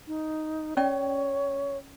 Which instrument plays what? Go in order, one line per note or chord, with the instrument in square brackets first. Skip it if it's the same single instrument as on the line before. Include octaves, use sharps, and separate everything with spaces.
[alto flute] D#4
[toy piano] C#4 D5 G5 [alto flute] C#5